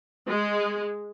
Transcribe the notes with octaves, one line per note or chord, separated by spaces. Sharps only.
G#3